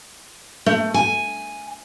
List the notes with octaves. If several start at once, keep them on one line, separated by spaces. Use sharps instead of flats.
A3
G#5